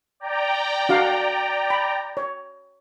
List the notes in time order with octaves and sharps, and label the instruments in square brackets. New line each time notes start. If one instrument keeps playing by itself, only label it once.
[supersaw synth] D5 G5 A#5
[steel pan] D4 F#4 F5
B5
C#5